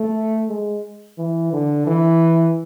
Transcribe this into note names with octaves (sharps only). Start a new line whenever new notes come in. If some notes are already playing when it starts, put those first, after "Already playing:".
Already playing: A3
G#3
E3
D3
E3